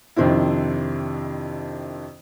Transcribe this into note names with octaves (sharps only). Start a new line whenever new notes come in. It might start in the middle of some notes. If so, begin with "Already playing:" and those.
F2 C3 D#3 C4 D4 E4